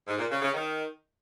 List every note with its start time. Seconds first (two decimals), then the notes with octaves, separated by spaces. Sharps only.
0.07 G#2
0.19 A#2
0.30 C#3
0.42 C#3
0.54 D#3